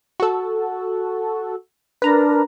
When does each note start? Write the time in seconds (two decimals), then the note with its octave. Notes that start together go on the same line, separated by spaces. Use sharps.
0.20 F#4 A4
2.02 D4 A#4 B4 A#5